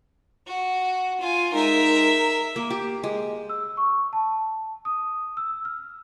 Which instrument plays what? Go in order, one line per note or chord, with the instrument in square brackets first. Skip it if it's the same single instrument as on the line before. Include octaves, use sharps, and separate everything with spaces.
[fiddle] F#4
F4 G#5
[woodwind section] G#3 D#4 [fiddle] A#4 E5
[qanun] A#3
G4
G#3
[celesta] E6
C#6
A5
D#6
E6
F6